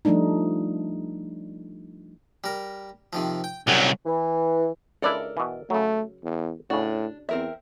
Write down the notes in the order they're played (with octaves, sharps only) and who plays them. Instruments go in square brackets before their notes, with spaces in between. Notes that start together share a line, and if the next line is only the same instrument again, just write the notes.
[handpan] F3 G3 A3 D4 D#4
[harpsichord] G3 A#4
C3 D#3 F3
G5
[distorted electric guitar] C2 F#3 [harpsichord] F#2 G3
[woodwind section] E3
[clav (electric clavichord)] C#2 D4 E4 [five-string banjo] A4 A#4 D5
[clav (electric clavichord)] B2 E3
[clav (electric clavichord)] C#3 F#3 [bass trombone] A3
[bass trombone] E2
[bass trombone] A2 [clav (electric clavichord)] C#3 F#4 [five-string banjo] D4
[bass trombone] E2 [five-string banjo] C4 A#4 E5